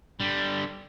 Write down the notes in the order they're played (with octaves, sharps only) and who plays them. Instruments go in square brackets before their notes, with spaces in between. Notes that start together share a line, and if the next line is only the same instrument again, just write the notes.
[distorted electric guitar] D3 G3